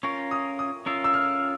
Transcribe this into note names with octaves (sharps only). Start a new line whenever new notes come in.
C#4 F4 A#4 C#6
D#6
D#6
C#4 F4 A#4 E6
E6
F6